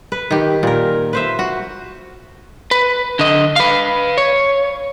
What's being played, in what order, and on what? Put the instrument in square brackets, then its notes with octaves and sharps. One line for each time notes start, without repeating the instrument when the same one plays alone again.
[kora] B4
D#3 G4
A#2 A#4
B4 C5 E5
F#4
[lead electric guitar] B4
D3 D#5
B4 F5
C#5